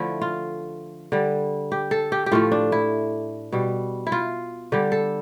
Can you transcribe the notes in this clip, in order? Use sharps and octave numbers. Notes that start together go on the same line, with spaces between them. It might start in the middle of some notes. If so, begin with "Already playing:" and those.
Already playing: D3 F3 A3 E4
F4
D3 G3
G4
A4
G4
G4
A2 F3 A3 F4
D4
E4
B2 G3
E4
F4
D3 G3 G4
A4